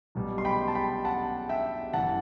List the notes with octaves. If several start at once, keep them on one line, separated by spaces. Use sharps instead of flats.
B1 B2 G3
C6
G5 B5
A5
G5 B5
F#5 A5
E5 G5
F#1 F#2 E3 F#5 A5